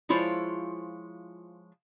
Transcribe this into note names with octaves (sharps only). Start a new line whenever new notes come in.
F3 G#3 E4 F4 C5 C#5